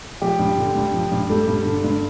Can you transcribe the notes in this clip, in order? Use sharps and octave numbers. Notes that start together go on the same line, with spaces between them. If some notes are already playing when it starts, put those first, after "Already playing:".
F3 G4
G2
D3
G2
F3
G2
G3 A4
G2
D3
G2